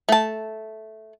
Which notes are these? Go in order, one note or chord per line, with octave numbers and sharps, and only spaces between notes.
A3 A5